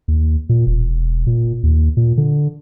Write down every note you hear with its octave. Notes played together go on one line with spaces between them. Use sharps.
D#2
A#2
E1
A#2
D#2
A#2
D3